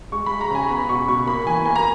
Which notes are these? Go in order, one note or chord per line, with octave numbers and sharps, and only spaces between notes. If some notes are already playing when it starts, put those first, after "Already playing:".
G#3 C#6
G#3 B5
A#5
C#3 G#5
B3 B5
B2 C#6
B2 C#6
A#3 B5
E3 G#5
A#3 G#5
A#5